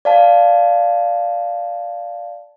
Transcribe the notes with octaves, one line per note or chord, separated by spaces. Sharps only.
D5 F5 A5